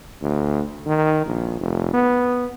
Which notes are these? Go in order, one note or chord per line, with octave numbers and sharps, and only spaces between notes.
D2
D#3
A#1
F1
B3